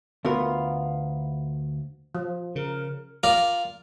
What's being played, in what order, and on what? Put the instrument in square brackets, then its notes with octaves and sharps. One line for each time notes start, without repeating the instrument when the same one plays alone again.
[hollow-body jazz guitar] D2 B3 F4 A#4
[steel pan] F3
[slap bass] C#3 [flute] A#4
[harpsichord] F4 A#4 D5